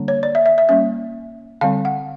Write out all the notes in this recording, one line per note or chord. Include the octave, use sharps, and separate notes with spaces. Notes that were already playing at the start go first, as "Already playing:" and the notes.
Already playing: D3 G3 A#3 D4
C#5
D5
E5
E5
E5
G3 A#3 C#4 E5
D3 G3 C4 F5
F#5